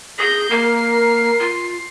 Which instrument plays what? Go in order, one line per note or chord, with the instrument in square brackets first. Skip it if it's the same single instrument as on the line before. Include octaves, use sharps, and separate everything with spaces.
[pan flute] G#4 [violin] G6 A#6
[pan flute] A#3 [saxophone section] A#4 [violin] C7
[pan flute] F4